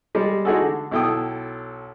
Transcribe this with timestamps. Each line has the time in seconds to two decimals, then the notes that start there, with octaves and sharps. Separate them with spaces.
0.15 G3 G#3 D5
0.45 G#3 D#4 E4 F#4 G#4 A4
0.62 D3
0.91 B1 E4 A4 G5 D#6